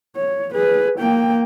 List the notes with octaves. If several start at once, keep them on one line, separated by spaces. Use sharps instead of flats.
C#5
G#4 B4
A#3 G5